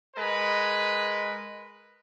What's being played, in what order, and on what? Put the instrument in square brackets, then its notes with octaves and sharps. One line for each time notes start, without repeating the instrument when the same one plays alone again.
[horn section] G#3 A#4 B4